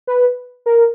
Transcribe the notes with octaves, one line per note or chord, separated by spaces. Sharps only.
B4
A#4